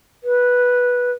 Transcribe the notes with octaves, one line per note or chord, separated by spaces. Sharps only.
B4